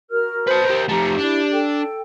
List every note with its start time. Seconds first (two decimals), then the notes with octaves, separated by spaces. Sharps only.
0.10 F#4 A#4 F6
0.48 B4 C5 A5
0.66 G4 A#4 G6
0.88 F2 A3 G4 A#5
1.18 D4 E4
1.52 A4 G5